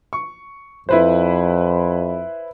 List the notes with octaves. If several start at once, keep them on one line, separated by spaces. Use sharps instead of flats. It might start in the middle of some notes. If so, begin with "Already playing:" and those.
C#6
F2 E4 B4 C5